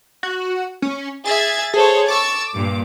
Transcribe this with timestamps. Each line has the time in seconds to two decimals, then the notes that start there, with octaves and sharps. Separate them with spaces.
0.23 F#4
0.82 C#4
1.25 G#4 E5 G#6 A6
1.74 G#4 A4 C5 C#5
2.08 C#6 D6 E6 A6
2.53 G2 A#2